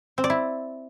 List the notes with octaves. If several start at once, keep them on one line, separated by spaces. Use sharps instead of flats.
C4
D5
E4